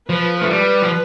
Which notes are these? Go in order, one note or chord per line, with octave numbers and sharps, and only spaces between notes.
F3 B4
A3
G3 B4
F3